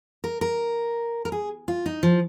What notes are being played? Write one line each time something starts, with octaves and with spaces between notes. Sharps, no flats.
A#4
A#4
A#4
G#4
F4
D#4
F3